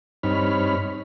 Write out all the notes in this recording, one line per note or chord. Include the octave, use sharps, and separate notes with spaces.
G2 C4 D#4 C#5 B5 F6